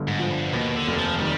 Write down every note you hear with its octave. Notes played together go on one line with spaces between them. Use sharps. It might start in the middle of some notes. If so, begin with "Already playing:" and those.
Already playing: G1 G2 D3
G#2
F3
G2
D#2 B2
D3
F1
F3
F3
D#3 G3